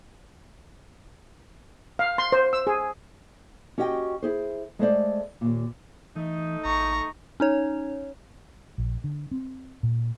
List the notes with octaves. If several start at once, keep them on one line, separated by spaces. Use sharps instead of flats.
F5
C6
C5
E6
G#4
C#4 F#4 G4 D#5 E5 G5
E4 G#4 C5
G#3 A3 C5 D5
D#2 A#2
E3 A3 D#4
A1 A#5 C#6
C#4 D#4 C#5
A#1
D3
C4
A#2